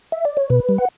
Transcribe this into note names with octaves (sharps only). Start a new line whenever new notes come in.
E5
D5
C#5
B2 B4
G3
F#5